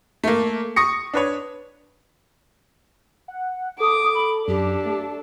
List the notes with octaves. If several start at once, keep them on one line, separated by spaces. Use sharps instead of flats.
A3 A#3
C#6 D#6 A#6 C#7
D4 B4 C#5
F#5
A4 D6 D#6
B5
F#2 D4 G4 A4
A3